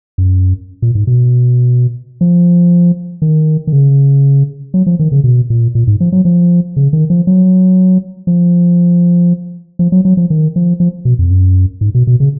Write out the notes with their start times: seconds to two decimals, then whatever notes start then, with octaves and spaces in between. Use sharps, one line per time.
0.18 F#2
0.82 A#2
0.95 G#2
1.07 B2
2.21 F3
3.22 D#3
3.67 D#3
3.73 C#3
4.74 F#3
4.86 F3
4.99 D#3
5.12 C#3
5.24 B2
5.50 A#2
5.75 A#2
5.87 G#2
6.00 F3
6.12 F#3
6.25 F3
6.77 C#3
6.93 D#3
7.10 F3
7.27 F#3
8.27 F3
9.79 F3
9.92 F#3
10.05 F#3
10.17 F3
10.30 D#3
10.56 F3
10.80 F3
11.05 B2
11.19 F2
11.30 F#2
11.81 G#2
11.95 B2
12.07 B2
12.20 C#3